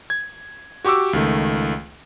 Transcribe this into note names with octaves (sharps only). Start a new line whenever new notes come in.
G#6
F#4 G4 C#6 D6 E6
C#2 D#3 A3